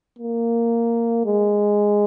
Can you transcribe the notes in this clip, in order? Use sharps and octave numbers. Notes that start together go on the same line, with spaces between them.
A#3
G#3